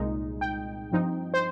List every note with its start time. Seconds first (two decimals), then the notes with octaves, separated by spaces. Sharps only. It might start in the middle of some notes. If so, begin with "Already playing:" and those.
Already playing: C2 A#2 G#3 D#4
0.41 G5
0.92 G2 F3 C4 D#4
1.34 C5